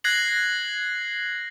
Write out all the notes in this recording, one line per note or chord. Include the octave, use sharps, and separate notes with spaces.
F#6 G#6 A#6 C7 F#7